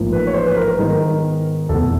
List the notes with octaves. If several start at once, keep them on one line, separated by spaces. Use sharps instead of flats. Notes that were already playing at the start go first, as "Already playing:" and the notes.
Already playing: A1 G#2 F3 A#3
B4
C#5
C5
B4
A#4
A#4
G#2 D#3 G#3 B3 D#4
F1 E2 B2 A4